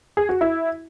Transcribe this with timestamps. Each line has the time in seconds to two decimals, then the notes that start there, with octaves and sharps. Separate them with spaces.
0.17 G#4
0.29 F#4
0.41 E4